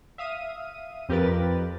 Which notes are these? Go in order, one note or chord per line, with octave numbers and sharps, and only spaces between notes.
E5 F5 D#6 D#7
F2 G4 A#4 B4 A6